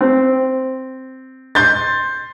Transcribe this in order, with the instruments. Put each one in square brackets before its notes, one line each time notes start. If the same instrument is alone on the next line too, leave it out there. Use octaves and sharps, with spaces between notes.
[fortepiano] C4
[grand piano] C6 G6 A6